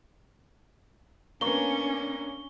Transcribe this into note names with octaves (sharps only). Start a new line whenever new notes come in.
A#3 B3 C#4 D4 C#6 G7